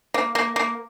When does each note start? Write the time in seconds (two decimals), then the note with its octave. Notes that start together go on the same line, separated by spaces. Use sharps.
0.14 A#3
0.35 A#3
0.56 A#3